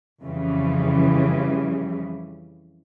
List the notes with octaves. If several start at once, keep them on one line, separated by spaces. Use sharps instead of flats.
F2 C#3 E3 G3